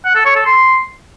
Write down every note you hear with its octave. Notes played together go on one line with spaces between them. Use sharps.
F#5
A4
C#5
A4
C6